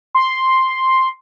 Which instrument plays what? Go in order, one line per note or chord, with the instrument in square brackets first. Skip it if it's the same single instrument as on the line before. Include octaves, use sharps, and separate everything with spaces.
[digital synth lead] C6